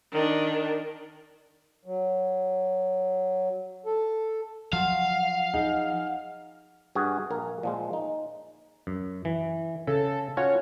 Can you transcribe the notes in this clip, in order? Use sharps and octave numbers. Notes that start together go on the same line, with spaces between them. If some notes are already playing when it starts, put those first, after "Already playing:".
D#3 D4
F#3
A4
F3 F#3 F5 F#5
D#4 G#4
G2 F#4 G#4 G#5
A#1 A#4 A#5
A#2 F3 G#3
D#4
F#2
E3
C#3 A4
C#4 F4 F#4 C#5